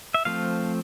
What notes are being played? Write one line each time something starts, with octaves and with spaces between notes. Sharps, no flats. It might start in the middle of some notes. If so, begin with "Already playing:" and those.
E5
F3 A3 C4 F5